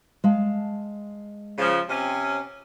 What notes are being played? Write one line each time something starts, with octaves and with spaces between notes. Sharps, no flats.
G#3 F5 A5
C#3 F3
C3 C4 C#4